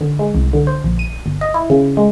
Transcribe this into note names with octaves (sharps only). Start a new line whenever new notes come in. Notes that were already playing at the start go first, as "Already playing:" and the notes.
D3
G#3
C2
D3
C5
A#1
D#7
G1
D#5
E4
C#3
G#3